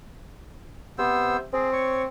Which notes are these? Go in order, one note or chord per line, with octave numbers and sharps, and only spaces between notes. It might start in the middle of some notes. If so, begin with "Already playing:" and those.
C3 B3 C5 E6
C4 G#4
C#5 C#6